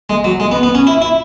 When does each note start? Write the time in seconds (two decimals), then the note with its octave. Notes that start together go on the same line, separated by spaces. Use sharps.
0.10 G#3
0.24 F#3
0.40 G#3
0.52 B3
0.63 B3
0.75 C#4
0.87 E4
1.02 E4